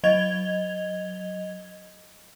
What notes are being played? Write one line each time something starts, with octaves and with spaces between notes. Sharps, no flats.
F#3 D#5 G#6 F7 G7